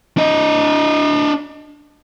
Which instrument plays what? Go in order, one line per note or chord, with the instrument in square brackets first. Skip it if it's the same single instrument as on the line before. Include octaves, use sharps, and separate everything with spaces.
[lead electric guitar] D4 D#5